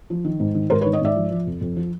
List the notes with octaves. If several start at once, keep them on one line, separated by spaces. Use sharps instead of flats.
F3
D#3
G#2
D#3
G#2 A#4 C5
B4 C#5
D#3
C#5 D#5
G#2 D5 E5
F3
F3
F2
F2
F3